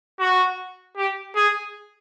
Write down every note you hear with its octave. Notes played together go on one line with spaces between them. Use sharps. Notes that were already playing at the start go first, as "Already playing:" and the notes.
F#4
G4
G#4